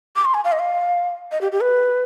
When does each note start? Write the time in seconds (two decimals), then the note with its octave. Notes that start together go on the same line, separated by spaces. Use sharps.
0.16 D6
0.25 C6
0.34 G#5
0.44 F5
0.52 D#5
0.59 F5
1.31 D#5
1.41 G4
1.52 G4
1.61 B4